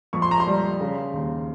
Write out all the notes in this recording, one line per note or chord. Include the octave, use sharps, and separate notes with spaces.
F2 C#6
C6
A#5
C6
G3
C#3
D#2